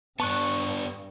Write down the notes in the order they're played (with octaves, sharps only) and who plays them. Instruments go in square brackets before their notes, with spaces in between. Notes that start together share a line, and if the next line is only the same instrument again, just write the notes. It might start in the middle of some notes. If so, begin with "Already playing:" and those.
[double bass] G2 [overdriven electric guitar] B3 D4 [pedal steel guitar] A5 C#6 F#6